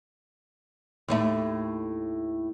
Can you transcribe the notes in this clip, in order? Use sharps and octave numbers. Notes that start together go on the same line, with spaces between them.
D#2 A2 A3